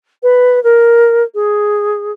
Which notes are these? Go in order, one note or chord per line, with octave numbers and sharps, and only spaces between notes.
B4
A#4
G#4